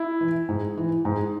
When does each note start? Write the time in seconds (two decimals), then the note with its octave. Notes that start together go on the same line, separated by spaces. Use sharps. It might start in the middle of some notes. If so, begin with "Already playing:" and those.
Already playing: E4
0.21 E3
0.49 G#2
0.78 E3
1.05 G#2